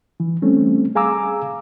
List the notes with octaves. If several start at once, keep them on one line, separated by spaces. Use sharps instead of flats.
E3
G3 A3 C4 C#4
G#4 F5 G#5 A#5 D6 E6